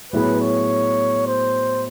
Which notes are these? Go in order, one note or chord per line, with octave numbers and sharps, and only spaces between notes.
A2 F#3 B3 E4 G#4 B4
C#5
C5